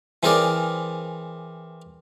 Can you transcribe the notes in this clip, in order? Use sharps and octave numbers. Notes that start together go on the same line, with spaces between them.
E3 C4 G#4 A#4 D5